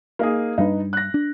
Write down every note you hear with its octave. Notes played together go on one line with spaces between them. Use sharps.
A#3 D#4 G#4
G2 G3 D4 D#4 B4
F#6 A#6
D4